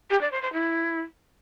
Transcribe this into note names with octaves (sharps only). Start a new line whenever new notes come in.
G4
D5
C5
C5
E4